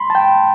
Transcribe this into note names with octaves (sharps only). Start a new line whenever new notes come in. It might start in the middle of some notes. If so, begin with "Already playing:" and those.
Already playing: B5 C6
A5
G5